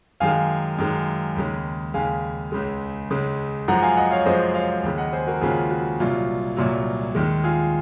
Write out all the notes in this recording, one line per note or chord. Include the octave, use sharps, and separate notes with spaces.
F#2 D#3 G#3 F5 G#5
F#2 D#3 G#3
D#2 C#3 G#3
D#2 C#3 G#3 F5 G#5
C#2 C#3 G#3
C#2 C#3 G#3
F#2 F3 G#3 F#5 A#5
F5 G#5
D#5 F#5
C#5 F5
F#2 F3 G#3 C5 D#5
C#5 F5
D#2 C#3 G#3
D#5 F#5
G#4 C5
F#4 A#4
D#2 C#3 G#3 F4 G#4
F#4
C2 A#2 F#3 F4
C2 A#2 F#3
D#2 D#3 G#3
F4 G#4